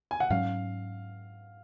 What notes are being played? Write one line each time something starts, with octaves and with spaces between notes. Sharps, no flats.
G#5
F#5
G#2 F#3 C#4 F5